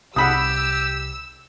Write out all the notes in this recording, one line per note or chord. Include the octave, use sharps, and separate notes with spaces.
C2 C3 G4 F#5 B5 D#6 E6